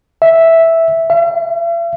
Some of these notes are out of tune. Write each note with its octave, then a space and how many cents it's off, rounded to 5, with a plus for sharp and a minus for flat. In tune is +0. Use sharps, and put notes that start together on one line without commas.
E5 -5
E5 +45